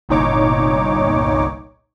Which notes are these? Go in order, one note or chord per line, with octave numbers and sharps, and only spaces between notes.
G1 C2 A#2 D#4 C#5 D6